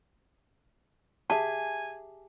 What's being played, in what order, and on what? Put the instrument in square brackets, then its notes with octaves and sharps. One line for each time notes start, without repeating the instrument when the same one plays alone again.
[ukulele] G4 G#4 E5 [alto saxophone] G#5 [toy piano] A5